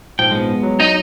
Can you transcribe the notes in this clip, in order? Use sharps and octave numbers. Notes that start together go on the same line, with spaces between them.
A#1 G#2 F3 G5
G#3 B3
F#3
D#4 D#5